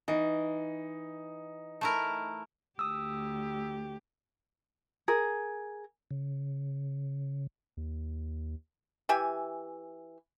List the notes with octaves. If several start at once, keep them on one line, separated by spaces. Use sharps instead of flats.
E3 D#4
A3 E4 A#4
D2 G4 D#6 E6
G#4 A#4
C#3
D#2
E3 G4 E5 G#5